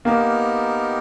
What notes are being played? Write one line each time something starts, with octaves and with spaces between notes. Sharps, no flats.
A#3 B3 D#4 G4 A#4